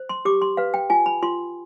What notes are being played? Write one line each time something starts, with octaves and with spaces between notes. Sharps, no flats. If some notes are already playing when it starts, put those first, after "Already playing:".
Already playing: C5
C6
G4 D6
C6
B4 F5
G5
F4 G#5
B5
F4 C6